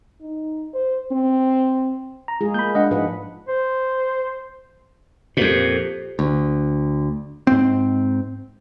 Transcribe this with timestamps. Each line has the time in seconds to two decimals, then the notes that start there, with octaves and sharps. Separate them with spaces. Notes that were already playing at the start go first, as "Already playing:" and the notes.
0.21 D#4
0.74 C5
1.12 C4
2.28 A#5
2.41 G#3 F4 G#4
2.54 A#3 B5 G6
2.75 G#3 D4 D#5 F#5
2.90 G#2 F3 B4 F#5
3.48 C5
5.37 F2 A#2 G4 A4 C5
6.19 D2
7.47 G#2 C4